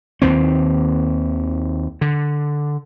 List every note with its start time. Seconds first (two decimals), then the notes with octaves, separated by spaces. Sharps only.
0.22 D#2 D#3 C4
2.01 D3